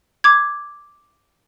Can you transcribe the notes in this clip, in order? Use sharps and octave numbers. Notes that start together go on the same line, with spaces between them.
D6 G#6